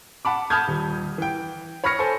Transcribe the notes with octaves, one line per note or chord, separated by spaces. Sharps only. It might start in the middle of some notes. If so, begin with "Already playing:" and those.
F#5 A5 B5 D6
A5 B5 D#6 F6 G6 G#6
D#1
E3 G5
C#5 B5 C#6 F6 A#6 C#7
A4 C5 G#5